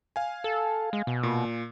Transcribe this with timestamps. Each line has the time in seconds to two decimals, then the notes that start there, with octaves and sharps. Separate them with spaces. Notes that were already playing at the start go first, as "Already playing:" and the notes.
0.16 F5 G#5
0.44 A4
0.93 G#3
1.07 B2
1.23 A#2